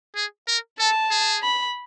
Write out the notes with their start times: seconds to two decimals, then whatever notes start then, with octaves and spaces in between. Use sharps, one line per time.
0.16 G#4
0.48 A#4
0.79 A4 A5
1.11 G#4
1.43 B5